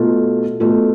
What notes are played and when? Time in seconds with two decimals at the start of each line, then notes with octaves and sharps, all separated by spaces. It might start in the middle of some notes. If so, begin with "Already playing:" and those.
Already playing: B2 A3 F4
0.60 B2 A3 F4